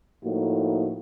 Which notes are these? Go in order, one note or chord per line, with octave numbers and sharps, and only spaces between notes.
A2 F3 A#3 D#4 F#4